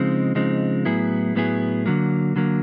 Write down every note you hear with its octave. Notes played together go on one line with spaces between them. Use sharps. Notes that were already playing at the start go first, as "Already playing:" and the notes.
Already playing: C#3 F3 G#3 C4 D#4
C#3 F3 G#3 C4 D#4
A2 F#3 B3 E4 G#4
A2 F#3 B3 E4 G#4
D3 F#3 A#3
D3 F#3 A#3